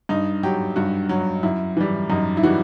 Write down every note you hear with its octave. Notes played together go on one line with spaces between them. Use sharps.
G2 D#4
F#3 G4
G2 F#4
F#3
F#2 E4
E3 G3
F#2 D#4
E4
E3 G3 F#4